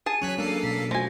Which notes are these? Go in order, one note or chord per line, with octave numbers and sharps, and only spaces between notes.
G#4 A5 D#7
F#3 C#4 C#5 F#6 B6
G#3 A#3 D4 A4 C7
B2 B6
F3 A3 F#4 G#5 A#6